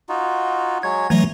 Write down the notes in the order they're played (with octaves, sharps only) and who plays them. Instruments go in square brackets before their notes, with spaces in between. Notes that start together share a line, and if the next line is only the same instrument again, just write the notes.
[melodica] D#4 F4 F#4
[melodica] F#3 G#3 C#5 [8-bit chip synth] G#6
[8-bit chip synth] E3 F#3 A3 [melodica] A#5